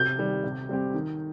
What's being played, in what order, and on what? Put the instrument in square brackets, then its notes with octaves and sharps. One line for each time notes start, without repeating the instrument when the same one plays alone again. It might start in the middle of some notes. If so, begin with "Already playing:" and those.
Already playing: [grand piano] C3 [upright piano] G6
[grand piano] D#3 G3
C3
G3 C4 G4
D#3